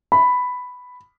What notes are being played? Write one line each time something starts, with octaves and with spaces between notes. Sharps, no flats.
B5